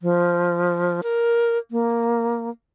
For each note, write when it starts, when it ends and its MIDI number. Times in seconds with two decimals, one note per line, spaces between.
0.01 1.01 53
1.03 1.58 70
1.71 2.50 58